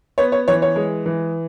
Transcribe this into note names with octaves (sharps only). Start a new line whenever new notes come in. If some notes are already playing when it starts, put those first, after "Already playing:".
B3 C#5
C#5
E3 C#5
C#5
G#3
E3